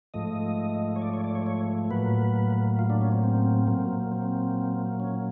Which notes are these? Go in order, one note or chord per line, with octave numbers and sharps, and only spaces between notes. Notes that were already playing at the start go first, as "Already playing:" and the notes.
G#2 F3 A3 D#5
C#5
D5
C#5
D5
C#5
C#5
A2 F#3 A#3 B4
F4
D4
C#4
C4
C4
A#2 F#3 A#3
C4
C#4